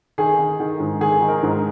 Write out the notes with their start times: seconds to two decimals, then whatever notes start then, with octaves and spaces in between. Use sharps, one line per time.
0.18 D#3 G#4
0.38 D#3
0.60 D#3
0.80 G#2
1.01 D#3 G#4
1.22 D#3
1.28 A#4
1.43 G#2